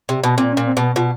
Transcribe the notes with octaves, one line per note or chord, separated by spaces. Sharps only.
C3
B2
A#2 C4
C#4
A#2
C4
B2 B3
B2 F4